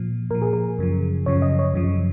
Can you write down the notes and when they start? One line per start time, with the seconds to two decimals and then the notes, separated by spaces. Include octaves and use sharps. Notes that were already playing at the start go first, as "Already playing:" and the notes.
Already playing: A#2 F3
0.31 A#2 F3 A#4
0.42 G#4
0.53 A#4
0.78 F#2 C#3 F3
1.26 F#2 C#3 F3 C#5
1.42 D#5
1.59 C#5
1.74 F#2 C#3 F3